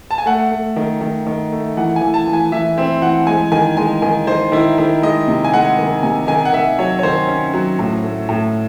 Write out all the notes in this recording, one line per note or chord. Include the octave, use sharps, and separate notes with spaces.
A5
G#5
A3 F#5
A3
D#3
D#3
D#3
A3
E3 F#5
G#5
E3
A5
E3
G#5
E3 E5
C4 E5
E3 F#5
G#3 G#5
D#3 G#5
G#3 G#5
D#3 G#5
D#3 C5
D#3 E4
D#3 E4
G#3 D#5
C3
G#5
G#3 F#5
D#3
C3 G#5
D#3 G#5
F#5
D#3 E5
F#3 C#5
C#5
D#3 C5
C#4
F#3
A2
A3
A2